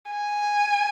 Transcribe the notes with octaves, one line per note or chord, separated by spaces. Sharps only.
G#5